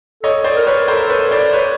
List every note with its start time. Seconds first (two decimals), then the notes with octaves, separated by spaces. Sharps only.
0.23 A4 C#5 D#5
0.44 C5 D5
0.56 A#4
0.67 B4 C#5
0.88 A4 A#4 C5
1.09 B4 C#5
1.31 C5 D5
1.53 B4 C#5